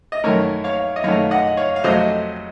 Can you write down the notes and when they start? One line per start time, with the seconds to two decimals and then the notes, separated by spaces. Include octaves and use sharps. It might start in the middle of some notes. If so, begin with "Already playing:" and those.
0.12 D#5
0.24 F#2 D#3 A3 A#4 C#5
0.64 C#5 F5
0.96 D#5
1.04 F#2 D#3 A3 C#5 F5
1.31 D#5 F#5
1.57 C#5 F5
1.76 F5
1.84 F2 C3 F#3 A3 C5 D#5